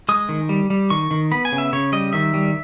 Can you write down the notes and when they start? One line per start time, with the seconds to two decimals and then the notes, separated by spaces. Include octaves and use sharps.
0.09 G#3 D#6
0.29 D#3
0.49 G3
0.70 G3
0.90 D#3 C#6
1.11 D#3
1.32 B3 B5
1.45 G#5
1.52 C#3
1.58 E5
1.73 C#3 C#5
1.92 G3 D#5
2.13 D#3 E5
2.34 G3